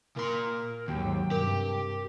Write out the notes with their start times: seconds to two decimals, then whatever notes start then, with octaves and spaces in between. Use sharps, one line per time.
0.17 A#2 A#4 C6
0.88 D#2 G#2 F#3 G5
1.31 G2 C3 G4 A#4